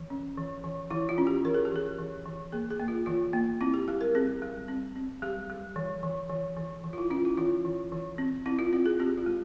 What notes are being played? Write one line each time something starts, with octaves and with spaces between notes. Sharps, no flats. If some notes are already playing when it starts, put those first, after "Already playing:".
Already playing: E3
C#4
E3
E3
E3 E4
F4
C#4
G4
E3 A#4
G#4
G4
E3 G#4
E3
E3
A#3 G#4
G#4
A#3
F4
E3 F4
A#3
C4 E4
G4
G3 G4
A#4
C4 G#4
G3
C4
C4
G3 G4
G3
E3
E3
E3
E3
E3
F4
E4
C#4 F4
E4
E3 F4
E3
E3
C4
C4 E4
F4
C4 F4
G#4
C4 G4
F4
G#3